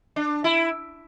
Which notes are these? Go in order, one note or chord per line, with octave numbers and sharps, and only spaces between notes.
D4
E4